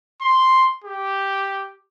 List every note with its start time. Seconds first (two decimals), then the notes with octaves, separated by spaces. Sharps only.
0.21 C6
0.84 G4